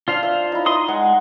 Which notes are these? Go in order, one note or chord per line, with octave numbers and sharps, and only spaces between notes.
D4 F4 C5 F5
E5
D#4 E4
D#5 C6 D#6
G#3 F#5